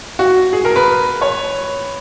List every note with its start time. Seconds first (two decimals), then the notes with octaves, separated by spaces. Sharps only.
0.19 F#4
0.53 G#4
0.65 A#4
0.76 B4
1.21 C#5